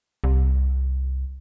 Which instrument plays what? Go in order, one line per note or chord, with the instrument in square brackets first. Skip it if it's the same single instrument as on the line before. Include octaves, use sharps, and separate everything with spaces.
[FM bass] C2